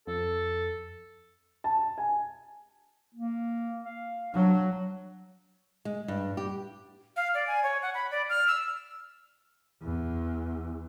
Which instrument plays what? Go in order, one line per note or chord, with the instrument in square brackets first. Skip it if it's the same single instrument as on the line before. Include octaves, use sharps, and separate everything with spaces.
[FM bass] F2 [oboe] A4
[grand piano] A5
G#5
[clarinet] A#3
F5
[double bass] F#3 [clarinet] D4
[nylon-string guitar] G#3
G2
G4
[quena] F5
D5
G#5
C#5
F#5
B5
D5
F6
E6
[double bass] E2